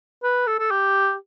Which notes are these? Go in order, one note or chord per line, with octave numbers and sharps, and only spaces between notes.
B4
A4
A4
G4